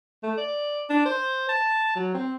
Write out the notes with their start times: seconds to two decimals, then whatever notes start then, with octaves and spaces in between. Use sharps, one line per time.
0.23 A3
0.38 D5
0.89 D4
1.05 C5
1.49 A5
1.95 F#3
2.14 C4